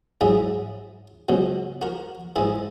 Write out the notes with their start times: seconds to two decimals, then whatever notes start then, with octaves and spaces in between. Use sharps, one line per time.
0.21 G#2 F#3 E4 G#4
1.29 C#2 B2 F#3
1.82 F#4 A#4
2.36 G#2 E3 E4 G#4